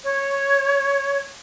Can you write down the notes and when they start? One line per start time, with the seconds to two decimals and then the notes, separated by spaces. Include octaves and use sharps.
0.04 C#5